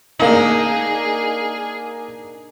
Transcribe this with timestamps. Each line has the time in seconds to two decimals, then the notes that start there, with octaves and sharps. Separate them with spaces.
0.20 A#3 D4 D#4 G#4 F#7